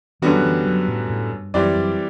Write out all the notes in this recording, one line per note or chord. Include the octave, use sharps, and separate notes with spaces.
F#2 D3 E3 G3 B3 F#4
F#3
E3
F#3
A2
A2
G2
F#2 E3 G3 C4 G4 D5
F#2